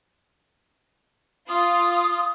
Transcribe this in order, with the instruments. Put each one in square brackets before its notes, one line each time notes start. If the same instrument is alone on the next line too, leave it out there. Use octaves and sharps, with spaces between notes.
[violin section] F4 [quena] D#6